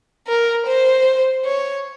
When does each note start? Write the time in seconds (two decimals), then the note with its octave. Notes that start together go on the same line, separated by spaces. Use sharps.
0.27 A#4
0.66 C5
1.45 C#5